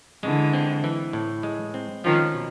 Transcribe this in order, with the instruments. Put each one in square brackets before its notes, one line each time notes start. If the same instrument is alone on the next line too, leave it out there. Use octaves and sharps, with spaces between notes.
[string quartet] D3 E3 [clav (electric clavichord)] G#3
[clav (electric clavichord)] C4
E3
A2
G#3
C4
[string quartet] D#3 F3 [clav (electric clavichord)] C#4
[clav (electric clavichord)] B2